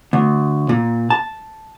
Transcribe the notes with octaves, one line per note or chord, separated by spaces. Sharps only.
D2
A#2
A5